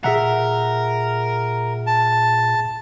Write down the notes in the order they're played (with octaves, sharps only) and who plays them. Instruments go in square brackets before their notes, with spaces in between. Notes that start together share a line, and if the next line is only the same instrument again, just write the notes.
[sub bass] A#2 [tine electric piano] G#4 E5 F#5 [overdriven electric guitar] A#4
[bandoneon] A5